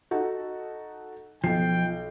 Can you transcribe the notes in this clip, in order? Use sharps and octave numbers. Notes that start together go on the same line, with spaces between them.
D#4 F#4 A4
B1 F3 G5 C7